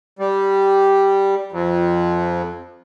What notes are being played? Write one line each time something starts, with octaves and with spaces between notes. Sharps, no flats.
G3
F2